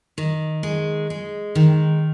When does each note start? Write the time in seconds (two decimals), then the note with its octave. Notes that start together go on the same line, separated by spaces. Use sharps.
0.18 D#3
0.63 G#3
1.10 G#3
1.55 D#3